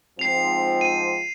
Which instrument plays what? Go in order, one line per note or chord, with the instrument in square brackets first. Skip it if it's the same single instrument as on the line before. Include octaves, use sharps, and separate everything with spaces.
[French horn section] G#2 F3 C4 [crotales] C7 F7
[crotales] D#7